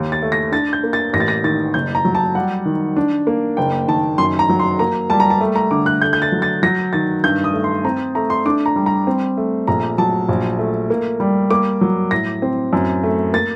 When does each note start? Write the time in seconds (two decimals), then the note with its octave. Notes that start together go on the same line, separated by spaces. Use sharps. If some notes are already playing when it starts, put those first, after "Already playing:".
Already playing: D#2
0.12 A6
0.22 A3
0.32 A#6
0.52 D4 A6
0.73 G6
0.83 A#3
0.93 A6
1.13 A1 A#6
1.20 A6
1.28 A#6
1.44 D#3 A6
1.74 F#1 G6
1.95 A#5
2.05 F#3
2.15 A5
2.35 G3 F#5
2.65 D#3
2.96 D4
3.27 A#3
3.57 F#1 G5
3.87 D#3 A5
4.18 F#2 C6
4.39 A#5
4.49 F#3
4.59 C6
4.79 A#3 A#5
5.10 G3 A5
5.20 A#5
5.30 A5
5.41 A3
5.56 A#5
5.71 D3 D6
5.86 F#6
6.02 A3 G6
6.13 G6
6.22 A6
6.32 F#3
6.42 A6
6.63 F#3 A#6
6.93 D#3 A6
7.24 G2 G6
7.44 D#6
7.53 A3
7.64 C6
7.85 C4 A#5
8.15 A3 A#5
8.30 C6
8.45 D4 D6
8.66 A#5
8.76 G3
8.86 A#5
9.07 C4
9.37 A3
9.68 A#1 A#5
9.98 F#3 A5
10.29 A#1
10.59 A3
10.90 A#3
11.20 G3
11.51 A#3 D6
11.81 F#3
12.11 A2 A#6
12.42 C4
12.73 F#2
13.04 A3
13.33 A#3 A6